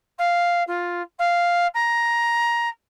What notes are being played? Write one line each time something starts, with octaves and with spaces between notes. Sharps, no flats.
F5
F4
F5
A#5